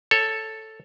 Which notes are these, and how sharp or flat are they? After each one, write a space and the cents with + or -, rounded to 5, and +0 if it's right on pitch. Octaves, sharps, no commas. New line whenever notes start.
A4 +0 C#5 -5